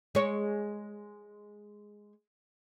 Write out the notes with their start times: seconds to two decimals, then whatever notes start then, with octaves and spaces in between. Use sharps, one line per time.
0.15 G#3 C#5